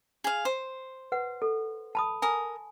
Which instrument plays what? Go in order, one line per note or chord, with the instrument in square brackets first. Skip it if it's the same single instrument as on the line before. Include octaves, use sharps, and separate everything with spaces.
[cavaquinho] G#4 F5
C5
[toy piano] B4 F#5
A4
A5 B5 D#6
[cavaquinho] A#4 D#6 [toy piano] G#5